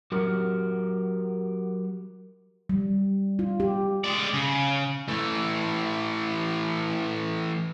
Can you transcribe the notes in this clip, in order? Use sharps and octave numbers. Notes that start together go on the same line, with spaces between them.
F#3 F#4 G4 A#4
G3
F4
G4
G#3 D5
C#3
E3 A3